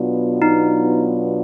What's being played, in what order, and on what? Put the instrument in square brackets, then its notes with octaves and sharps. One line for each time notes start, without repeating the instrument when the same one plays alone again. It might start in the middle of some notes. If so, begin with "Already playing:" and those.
Already playing: [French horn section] B2 F#3 B3 D4 F4
[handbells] D#4